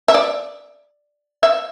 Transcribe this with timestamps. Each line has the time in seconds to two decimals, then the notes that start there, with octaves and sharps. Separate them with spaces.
0.08 E5
0.14 D5
1.43 E5